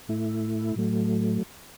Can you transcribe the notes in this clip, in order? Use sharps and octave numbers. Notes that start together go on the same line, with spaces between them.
A2 A3 E4
A2 F#3 A3